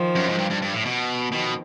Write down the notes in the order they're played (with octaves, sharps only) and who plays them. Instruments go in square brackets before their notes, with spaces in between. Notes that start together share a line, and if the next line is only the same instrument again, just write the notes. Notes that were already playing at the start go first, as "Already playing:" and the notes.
Already playing: [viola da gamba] D#3 F3
[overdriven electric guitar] F#2
G#2
G2
G2
G2
A2
B2
[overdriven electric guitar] B2 [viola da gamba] D#3 F3